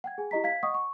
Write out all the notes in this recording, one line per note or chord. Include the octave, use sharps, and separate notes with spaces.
F#5 G5 G#6
G#4 G#5
E4 G4 D#5 A#5 B6
F5 G#6 B6
D#5 F#5 C#6 D#6
C#6